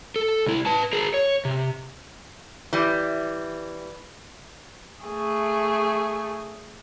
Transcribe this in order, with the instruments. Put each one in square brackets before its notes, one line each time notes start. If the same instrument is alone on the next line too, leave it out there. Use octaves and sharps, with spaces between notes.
[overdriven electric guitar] A4
C2 E4
B4 A5
G#4 A#4
C#5
C3
[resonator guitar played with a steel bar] E3 G3
[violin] A3 G#4